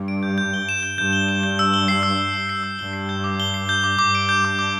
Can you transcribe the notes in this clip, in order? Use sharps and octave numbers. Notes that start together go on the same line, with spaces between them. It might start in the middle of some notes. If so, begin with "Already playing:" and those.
Already playing: G2
D7
G6
G6
G7
E7
G6
G2 G6
G7
E7
G6
E6
G7
C7
E6
E6
G7
C7
E6
G2 G7
C7
G6
D6
G7
C7
G6
D6
G2 D6
D7
G6
D6
D6